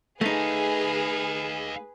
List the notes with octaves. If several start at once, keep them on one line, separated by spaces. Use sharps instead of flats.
A3 D#4 G#4 B4 D#5 F5